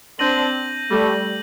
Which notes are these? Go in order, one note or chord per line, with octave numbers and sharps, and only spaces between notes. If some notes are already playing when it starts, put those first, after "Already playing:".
C4 D4 G6 A#6 D#7 F#7
G3 A3